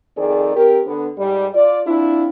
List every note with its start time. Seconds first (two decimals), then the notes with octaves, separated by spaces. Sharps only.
0.18 F2 D#3 C4 G#4 D5
0.56 C4 G4 A#4
0.87 D3 B3
1.18 G#2 G3
1.54 F4 D5
1.87 C4 D4 E4 F4